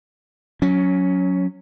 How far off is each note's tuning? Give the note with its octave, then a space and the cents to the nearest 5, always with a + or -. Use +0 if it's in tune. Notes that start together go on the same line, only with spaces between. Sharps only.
F#3 -10 C#4 +10